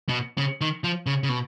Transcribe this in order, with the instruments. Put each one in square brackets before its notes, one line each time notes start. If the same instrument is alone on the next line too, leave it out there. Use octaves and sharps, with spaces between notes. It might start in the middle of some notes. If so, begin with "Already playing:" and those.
[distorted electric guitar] B2
C#3
D#3
F3
C#3
C#3
B2